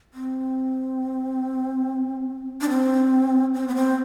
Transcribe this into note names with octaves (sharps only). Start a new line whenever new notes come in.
C4
D4
C4
C4
B3
C4